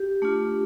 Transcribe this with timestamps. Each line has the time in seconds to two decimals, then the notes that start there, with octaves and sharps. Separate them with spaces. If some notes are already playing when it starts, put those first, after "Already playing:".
Already playing: G4
0.22 A3 D4 F4